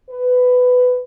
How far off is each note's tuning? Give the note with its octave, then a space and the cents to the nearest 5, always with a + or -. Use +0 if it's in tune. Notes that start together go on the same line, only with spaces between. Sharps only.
B4 +15